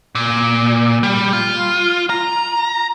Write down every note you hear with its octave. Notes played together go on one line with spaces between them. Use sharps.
A#2
G3
F4
A#5